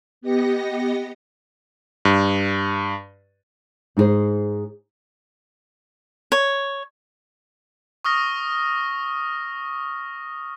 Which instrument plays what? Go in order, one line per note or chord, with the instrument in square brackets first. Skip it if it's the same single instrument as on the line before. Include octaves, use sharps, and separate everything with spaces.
[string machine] B3 G4 D#5 A#6 C#7
[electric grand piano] G2
[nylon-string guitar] G#2 D#4 F4 G#4 C5
[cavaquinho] C#5
[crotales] C#6 D#6 F6 A#6